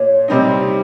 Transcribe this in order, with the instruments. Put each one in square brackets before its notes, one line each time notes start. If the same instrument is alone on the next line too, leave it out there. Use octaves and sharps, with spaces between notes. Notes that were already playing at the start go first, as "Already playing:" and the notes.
Already playing: [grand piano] A#2 [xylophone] C#5
[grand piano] C3 G3 C4 D#4